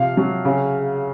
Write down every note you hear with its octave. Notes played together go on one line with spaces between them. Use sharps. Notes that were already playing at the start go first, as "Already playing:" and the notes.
Already playing: C3 F3 F5
F#3
C#3